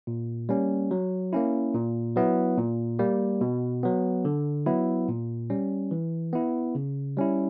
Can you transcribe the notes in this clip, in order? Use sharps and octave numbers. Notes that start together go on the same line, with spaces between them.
A#2
G3 A#3 C#4
F#3
A#3 C#4 E4
A#2
F#3 B3 E4
A#2
G3 A#3
B2
F#3 B3
D3
F#3 B3 E4
A#2
G3 C#4
E3
B3 E4
C#3
G3 C#4 E4